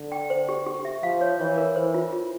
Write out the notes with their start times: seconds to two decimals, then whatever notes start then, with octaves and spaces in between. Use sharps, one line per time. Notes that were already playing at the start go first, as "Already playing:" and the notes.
Already playing: D3
0.12 G5
0.30 C5
0.49 G4
0.66 G4
0.85 E5
1.03 F3 F5
1.21 C#5
1.39 E3 C#5
1.58 A#4
1.76 E3 C5
1.94 F4
2.13 F4